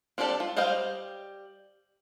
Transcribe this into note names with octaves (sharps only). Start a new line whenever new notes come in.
C4 D4 G4 A4 D5
F4
G3 C5 D#5 F5 G5